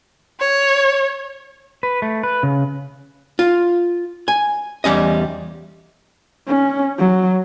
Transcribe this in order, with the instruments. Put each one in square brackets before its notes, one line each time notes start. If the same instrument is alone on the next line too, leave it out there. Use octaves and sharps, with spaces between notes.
[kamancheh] C#5
[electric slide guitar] B4
A3
B4
C#3
[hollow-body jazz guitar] F4
G#5
E2 G3 C#4 D#5
[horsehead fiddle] C#4
F#3